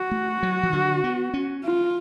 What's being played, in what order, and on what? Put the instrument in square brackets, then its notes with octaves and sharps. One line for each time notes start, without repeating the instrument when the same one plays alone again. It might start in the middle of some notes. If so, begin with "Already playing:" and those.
Already playing: [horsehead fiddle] F#4
[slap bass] A3
F#3
F3
D3
B3
C#4
[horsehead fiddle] F4